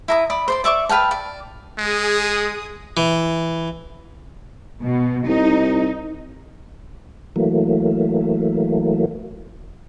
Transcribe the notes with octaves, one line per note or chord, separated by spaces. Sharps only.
E4 A#5 D#6
D5 B5 D#6
C5 D5 C6
D5 E5 C#6 D6
B4 F5 G5 A5
D5
G#3 G#4 D#6
E3
B2
C2 D#4
E3 F#3 A3 A#3